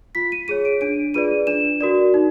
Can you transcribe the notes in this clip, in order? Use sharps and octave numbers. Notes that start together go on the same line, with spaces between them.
F4 B6
D#7
G#4 C#5 D#7
D7
D4 D7
F4 G#4 B4 D5 D#7
D4 E7
F#4 A#4 D5
D#4